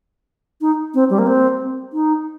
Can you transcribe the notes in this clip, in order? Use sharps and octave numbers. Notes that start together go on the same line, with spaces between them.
D#4
C4
G3
A#3
C4
D#4